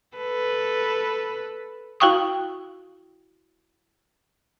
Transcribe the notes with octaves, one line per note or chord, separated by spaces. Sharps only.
A4 B4
E4 F#4 F5 G5 C#6 D#6